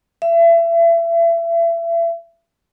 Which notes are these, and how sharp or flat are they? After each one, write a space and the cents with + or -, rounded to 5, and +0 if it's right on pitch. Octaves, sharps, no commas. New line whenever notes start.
E5 +30